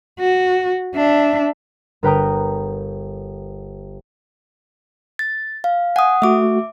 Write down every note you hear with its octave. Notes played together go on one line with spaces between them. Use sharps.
F#4
D4 E5
G1 A#4 B4 G5 A#5 D#6
A6
F5
F#5 G#5 D#6
A3 F#4 E5 D6